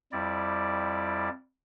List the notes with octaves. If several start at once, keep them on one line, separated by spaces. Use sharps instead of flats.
F2 G3 E4 D5